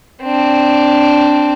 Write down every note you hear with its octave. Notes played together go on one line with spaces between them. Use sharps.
C4 D4